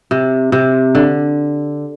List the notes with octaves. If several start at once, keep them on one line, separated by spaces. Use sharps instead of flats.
C3
C3
D3